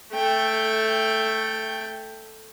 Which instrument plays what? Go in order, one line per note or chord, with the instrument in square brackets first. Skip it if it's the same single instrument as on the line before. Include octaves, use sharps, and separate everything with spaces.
[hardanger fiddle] A3 G5